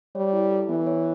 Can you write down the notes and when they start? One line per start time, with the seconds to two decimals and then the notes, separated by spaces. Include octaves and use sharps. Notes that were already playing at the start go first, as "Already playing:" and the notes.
0.15 G3 C#5
0.33 E4
0.51 A4
0.69 E3 B3
0.86 C#5